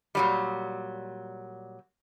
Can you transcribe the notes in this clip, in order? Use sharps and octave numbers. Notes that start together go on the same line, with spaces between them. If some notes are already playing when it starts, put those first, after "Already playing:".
A#2 F#3 G3